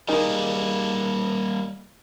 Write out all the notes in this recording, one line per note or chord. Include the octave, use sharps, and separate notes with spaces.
D#3 G3 A#3 D#4 G#4